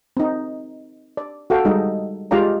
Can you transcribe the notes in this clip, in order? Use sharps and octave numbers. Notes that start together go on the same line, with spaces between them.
C4 D#4
D5
F#4 A4 F5 G5
G3 G#3 D#4
G#3 F4 G4 D5 F5 A#5